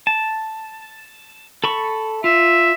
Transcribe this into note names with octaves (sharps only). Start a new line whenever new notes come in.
A5
A4 B5 C#6
F4 E5